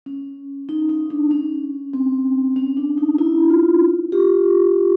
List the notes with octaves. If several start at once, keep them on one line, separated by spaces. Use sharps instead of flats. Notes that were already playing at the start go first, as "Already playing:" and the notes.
C#4
D#4
D#4
D4
C#4
C4
C#4
D4
D#4
E4
F4
F4 G4